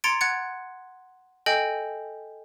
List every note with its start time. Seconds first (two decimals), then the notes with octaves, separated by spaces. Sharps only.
0.04 A#5 C6 G#6 A6 C#7 D7
0.21 F#5 F#6 G#6 A6 C#7
1.46 A4 D#5 G5 G#5 G6